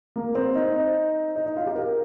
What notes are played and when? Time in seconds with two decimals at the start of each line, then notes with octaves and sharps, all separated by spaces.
0.16 A#3
0.35 C4
0.55 D#4
1.36 D#4
1.46 D#4
1.56 F4
1.66 G4
1.75 A#4